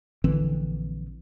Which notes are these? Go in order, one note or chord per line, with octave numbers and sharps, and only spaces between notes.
A#1 D3 E3 C4